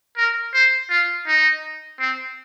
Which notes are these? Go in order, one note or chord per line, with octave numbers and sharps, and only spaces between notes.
A#4
C5
F4
D#4
C4